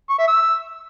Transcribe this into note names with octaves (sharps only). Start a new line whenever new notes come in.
C#6
E5
E6